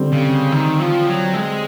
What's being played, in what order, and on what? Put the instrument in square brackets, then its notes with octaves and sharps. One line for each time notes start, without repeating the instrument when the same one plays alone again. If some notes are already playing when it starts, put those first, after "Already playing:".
Already playing: [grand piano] D3 G3 C4
[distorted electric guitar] C#3
D#3
F3
F#3
G#3